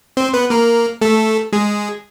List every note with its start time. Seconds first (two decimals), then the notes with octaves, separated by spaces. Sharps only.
0.17 C4 C5
0.33 B3 B4
0.50 A#3 A#4
1.01 A3 A4
1.53 G#3 G#4